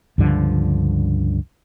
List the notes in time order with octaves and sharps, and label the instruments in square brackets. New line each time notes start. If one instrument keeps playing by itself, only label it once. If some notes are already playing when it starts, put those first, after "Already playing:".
[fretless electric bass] C#2 G2 D3 F3